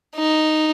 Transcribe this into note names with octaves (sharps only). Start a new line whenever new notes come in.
D#4